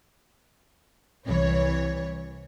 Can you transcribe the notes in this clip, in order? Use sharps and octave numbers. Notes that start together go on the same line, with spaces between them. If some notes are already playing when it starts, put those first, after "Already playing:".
C2 E3 C#5